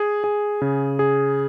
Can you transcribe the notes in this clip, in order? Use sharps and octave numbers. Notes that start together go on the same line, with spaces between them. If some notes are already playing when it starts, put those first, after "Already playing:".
Already playing: G#4
G#4
C#3
G#4